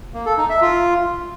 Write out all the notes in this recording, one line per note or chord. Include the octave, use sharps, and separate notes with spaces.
A#3
A4
D#4
E5
F4